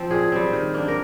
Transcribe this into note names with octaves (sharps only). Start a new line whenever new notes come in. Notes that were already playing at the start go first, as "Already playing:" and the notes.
Already playing: F3 C4
A#2 G#4
G3 C4
D#3
A#3 D4
A#4